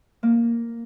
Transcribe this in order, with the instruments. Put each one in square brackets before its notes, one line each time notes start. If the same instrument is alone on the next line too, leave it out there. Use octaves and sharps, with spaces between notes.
[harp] A#3